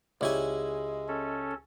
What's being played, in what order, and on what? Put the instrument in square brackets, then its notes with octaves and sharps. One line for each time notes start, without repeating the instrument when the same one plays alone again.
[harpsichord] C#2 E4 G#5 [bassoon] G#3 [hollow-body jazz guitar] G4 C#5 D5
[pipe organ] C#4 A4